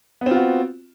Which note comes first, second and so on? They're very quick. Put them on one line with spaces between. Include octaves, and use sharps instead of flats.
B3 C4 F4 F#4